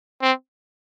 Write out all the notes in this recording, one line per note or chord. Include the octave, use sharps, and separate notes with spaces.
C4